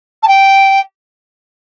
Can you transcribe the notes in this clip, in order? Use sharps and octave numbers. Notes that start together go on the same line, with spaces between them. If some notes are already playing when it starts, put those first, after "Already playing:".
A5
G5